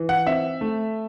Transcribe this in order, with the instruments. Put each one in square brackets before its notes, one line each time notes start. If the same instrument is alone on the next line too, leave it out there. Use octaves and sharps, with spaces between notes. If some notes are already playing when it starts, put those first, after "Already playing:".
Already playing: [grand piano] E3
F#5
C4 E5
A3